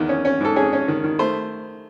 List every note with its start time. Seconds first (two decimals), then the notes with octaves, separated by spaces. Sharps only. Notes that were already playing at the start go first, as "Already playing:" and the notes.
Already playing: E2 D#3
0.09 C#4
0.25 C#4
0.41 G#2 A4
0.56 C#4 G#4
0.73 C#4
0.88 D#3
1.04 D#3
1.19 A3 C5